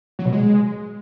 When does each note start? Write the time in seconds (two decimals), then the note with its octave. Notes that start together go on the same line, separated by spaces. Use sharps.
0.19 F#3
0.26 B2
0.32 G#3